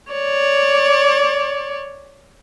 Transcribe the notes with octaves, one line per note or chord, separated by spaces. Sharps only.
C#5 D5